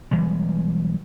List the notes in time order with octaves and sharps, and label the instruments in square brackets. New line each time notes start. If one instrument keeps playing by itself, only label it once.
[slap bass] B1 E3 G3 G#3